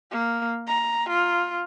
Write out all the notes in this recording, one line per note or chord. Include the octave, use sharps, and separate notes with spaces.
A#3
A#5
F4